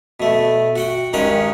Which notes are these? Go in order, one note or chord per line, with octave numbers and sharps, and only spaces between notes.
B2 A3
F#4 F#5 G5
G2 D#3 G#3 C#4 A#4 F#5